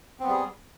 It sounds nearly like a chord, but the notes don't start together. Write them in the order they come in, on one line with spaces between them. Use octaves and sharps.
C4 B3 G3 G#4